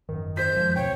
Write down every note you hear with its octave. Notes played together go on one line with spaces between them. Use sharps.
G#1 F#2 D#3
C5 G6 B6
F#2 D#3 F3 G#3
D#2 B2 C4 C#5 G5